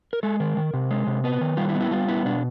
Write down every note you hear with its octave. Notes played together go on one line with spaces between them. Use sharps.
A#4
G#3 A4
D#3 A#4
D#3
C3
G#3
C3
B3 B4
D#3
G3 F4
E4
B3
E4
G3 F4
B3 E4
B2 D4